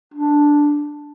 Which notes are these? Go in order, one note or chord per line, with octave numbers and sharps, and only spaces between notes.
D4